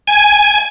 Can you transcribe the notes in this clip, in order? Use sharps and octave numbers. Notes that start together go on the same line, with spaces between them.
G#5